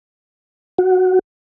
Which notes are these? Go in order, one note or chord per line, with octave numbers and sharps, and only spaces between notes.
F#4